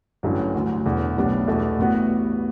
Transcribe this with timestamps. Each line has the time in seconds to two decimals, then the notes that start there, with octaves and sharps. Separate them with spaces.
0.23 A1 G2 D3 F#3 C#4
0.54 D2 D3 F#3
0.85 E1 E2 D3
1.17 B1 A2 G3 B3 D4
1.48 E2 B2 A3
1.78 A1 A2 G3 B3 F#4